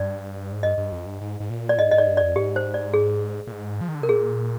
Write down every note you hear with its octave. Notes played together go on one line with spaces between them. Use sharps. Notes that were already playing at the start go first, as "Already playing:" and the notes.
Already playing: G2 D5
G#2
G2 D#5
G2
F2
G2
G#2
G#2
A#2
D5
G#2 D#5
G#2 D#5
D5
G2
F2 D5
G#2 G4
C5
D5
G#4
A#2
G#2
F3
D#3
D3
C3 A#4
A#2 G#4